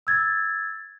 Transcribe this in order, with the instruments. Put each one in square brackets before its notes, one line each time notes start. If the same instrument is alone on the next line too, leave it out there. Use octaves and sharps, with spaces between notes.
[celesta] E6 G#6 A6